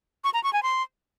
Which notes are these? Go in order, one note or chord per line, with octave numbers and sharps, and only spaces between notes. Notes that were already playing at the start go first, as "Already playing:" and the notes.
C#6
A#5
C#6
G#5
C6